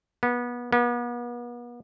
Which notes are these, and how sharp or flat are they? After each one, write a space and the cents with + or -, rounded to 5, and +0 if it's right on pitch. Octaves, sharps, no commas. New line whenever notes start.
B3 -25
B3 -40